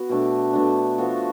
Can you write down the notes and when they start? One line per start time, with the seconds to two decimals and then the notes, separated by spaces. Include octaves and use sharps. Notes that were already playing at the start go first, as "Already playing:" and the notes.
Already playing: B3 F#4
0.09 B2 A3 D4
0.53 B2 A3 D4
0.98 F3 B3 F#4 A4